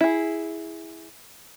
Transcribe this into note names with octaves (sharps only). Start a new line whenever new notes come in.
E4 G#4